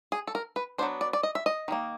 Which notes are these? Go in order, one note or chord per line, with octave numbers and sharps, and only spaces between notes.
G#4
A4
A#4
B4
F#3 B3 D4 C5
D5
D5
D#5
E5
D#5
D#3 G3 A#3